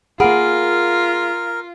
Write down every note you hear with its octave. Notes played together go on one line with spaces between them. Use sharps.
A#3 F4 G#4 A#4 F#5 G#5 B5